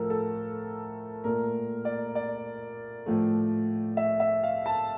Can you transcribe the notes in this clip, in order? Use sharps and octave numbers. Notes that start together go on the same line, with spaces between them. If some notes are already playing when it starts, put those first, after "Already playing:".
Already playing: A2 F3 A3 A4 A#4
A4
A#2 A3 A#4
D5
D5
A2 F3 A3
E5
E5
F5
A5